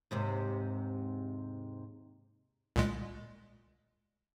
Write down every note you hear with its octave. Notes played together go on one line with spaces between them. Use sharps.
D#2 G#2 C3
C2 A#2 G#3